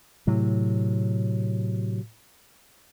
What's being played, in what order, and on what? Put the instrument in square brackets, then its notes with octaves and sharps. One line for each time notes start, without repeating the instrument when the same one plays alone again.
[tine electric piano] A2 [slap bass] C3 F#3